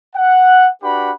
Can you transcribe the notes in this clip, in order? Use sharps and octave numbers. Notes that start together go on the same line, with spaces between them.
F#5
D4 F#4 G4 B4 F#5 B5